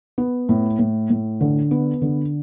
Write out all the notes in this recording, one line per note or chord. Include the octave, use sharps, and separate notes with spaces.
B3
A2
A2
A2
D3
B3
D3